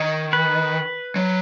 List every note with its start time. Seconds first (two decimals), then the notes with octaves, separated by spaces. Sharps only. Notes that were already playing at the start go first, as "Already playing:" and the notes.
Already playing: D#3 C#5
0.33 B4
1.16 F#3